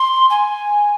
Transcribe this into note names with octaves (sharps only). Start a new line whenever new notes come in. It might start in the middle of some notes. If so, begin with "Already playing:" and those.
Already playing: C6
G#5